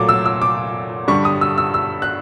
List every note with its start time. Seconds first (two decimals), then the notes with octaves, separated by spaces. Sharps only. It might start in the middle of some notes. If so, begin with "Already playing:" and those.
Already playing: A#2 F#3 A3 D6
0.09 E6
0.26 E6
0.42 D6
1.08 G2 D3 G3 C#6
1.25 D#6
1.41 E6
1.58 E6
1.74 E6
2.02 F#6